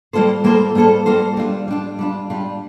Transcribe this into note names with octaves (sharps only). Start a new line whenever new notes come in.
G3 A#3 F4 A4 C5
G3 A#3 F4 A4 C5
G3 A#3 F4 A4 C5
G3 A#3 F4 A4 C5
G3 D4 F4
G3 D4 F4
G3 D4 F4
G3 D4 F4